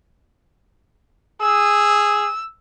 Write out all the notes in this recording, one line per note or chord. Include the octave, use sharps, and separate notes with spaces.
G#4 E6